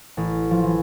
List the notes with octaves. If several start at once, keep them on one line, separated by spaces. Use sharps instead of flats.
A1
F3
E3